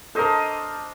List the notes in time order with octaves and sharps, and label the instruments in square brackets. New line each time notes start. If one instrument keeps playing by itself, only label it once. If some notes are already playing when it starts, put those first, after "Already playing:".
[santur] D4 C5 D#5 [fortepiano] A4 A#4